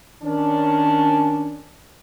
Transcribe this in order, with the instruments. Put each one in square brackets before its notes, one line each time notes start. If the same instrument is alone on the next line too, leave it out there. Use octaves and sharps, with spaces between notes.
[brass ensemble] D#3 C#4 D4